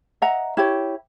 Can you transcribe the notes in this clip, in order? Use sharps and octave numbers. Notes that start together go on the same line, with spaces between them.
D#5 E5 F#5 A#5
E4 G4 C#5